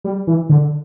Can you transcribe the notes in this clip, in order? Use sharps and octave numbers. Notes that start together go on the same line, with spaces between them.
G3
E3
D3